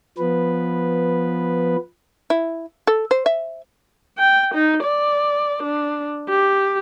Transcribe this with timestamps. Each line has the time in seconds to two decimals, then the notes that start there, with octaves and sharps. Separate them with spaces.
0.18 F3 B3 B4
2.30 E4
2.87 A4
3.11 C5
3.26 E5
4.18 G5
4.55 D#4
4.84 D5
5.63 D4
6.29 G4